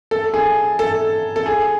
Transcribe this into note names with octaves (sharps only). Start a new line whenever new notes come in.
A4
G#4
A4
A4
G#4